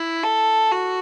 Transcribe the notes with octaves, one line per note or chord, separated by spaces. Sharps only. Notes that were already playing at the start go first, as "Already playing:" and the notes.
Already playing: E4
A4
F#4